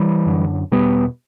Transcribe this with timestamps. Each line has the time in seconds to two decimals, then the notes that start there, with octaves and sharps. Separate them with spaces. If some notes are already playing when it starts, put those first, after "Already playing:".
Already playing: E3 G3
0.26 F#2 D3
0.72 E2 B2 G3 B3